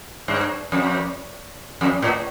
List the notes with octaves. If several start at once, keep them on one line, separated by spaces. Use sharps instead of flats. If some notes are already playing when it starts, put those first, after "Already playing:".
G2
F2
F2
A2